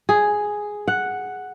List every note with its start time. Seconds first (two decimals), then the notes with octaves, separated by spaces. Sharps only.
0.09 G#4
0.88 F#5